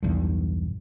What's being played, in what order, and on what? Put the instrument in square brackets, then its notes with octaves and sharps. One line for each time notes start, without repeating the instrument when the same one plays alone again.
[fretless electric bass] B1 E2 G2